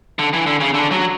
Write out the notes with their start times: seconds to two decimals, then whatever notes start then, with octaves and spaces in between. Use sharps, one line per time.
0.19 D3
0.33 E3
0.46 D3
0.60 C#3
0.74 D3
0.91 F#3